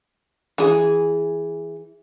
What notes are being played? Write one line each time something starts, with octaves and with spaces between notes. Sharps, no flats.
E3 G#4